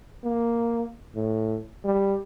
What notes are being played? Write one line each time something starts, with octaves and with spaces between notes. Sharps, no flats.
A#3
A2
G3